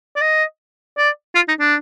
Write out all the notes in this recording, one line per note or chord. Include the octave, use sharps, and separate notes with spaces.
D5
D#5
D5
F4
D#4
D4